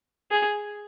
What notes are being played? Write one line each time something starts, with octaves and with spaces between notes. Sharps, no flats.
G#4